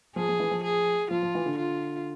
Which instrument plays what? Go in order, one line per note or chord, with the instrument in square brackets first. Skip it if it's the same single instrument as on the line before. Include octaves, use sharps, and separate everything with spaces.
[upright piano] F3 [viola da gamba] G#4
[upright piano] F3
E3
F3
[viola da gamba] G#4
[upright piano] F3 [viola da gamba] F4
[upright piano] F3
E3
D3
[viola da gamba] F4